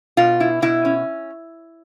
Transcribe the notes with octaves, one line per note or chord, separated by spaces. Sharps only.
B2 F4
E4
B2 E4
C#4